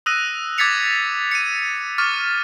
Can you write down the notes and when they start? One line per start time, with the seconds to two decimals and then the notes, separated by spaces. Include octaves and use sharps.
0.06 D#6 E6 F#6 A#6 D#7
0.58 D6 G#6 A6 B6 C#7 F7
1.32 C#7 D#7
1.98 C#6 D6 F6 A6